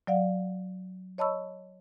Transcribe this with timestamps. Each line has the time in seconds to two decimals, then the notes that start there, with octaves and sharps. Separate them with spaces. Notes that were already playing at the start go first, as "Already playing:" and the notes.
0.07 F#3 D5 F5 F#5
1.18 C#5 D#5 A5 B5 C#6 E6